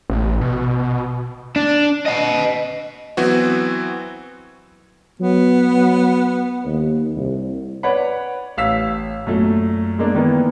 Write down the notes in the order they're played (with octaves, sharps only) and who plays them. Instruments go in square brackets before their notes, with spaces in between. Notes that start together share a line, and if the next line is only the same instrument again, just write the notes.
[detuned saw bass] A1
B2
[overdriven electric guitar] D4
D#5 F#5
[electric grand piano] E3 F#3 B3 C4 F#4
[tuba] F#3 [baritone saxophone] B3
[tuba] F#3
D#2
C2
[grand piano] B4 C#5 D5 F#5 B5
A1 F5 E6 B6
F#2 A#2 A3
G#3 A#3 D4
D#3 E3 A#3 B3